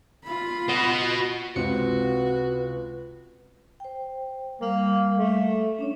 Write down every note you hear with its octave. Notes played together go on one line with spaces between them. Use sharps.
F4 B5
F#4 D#5
C#2 C3 C4 F#4 B4 C#7
C5 G5
G3 A#3 F5
A3
C#4 D4 C#5